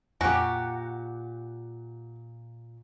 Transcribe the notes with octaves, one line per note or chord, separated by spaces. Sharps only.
F2 A#2 F#4 G4 G#5 D6